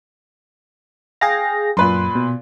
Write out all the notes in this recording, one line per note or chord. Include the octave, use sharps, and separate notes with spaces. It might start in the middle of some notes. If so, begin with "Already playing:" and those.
G#4 F5 G5 A#6
F#2 A#2 B4 C6
B2